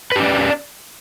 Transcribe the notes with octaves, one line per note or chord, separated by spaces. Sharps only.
C#4 G4 B4 D5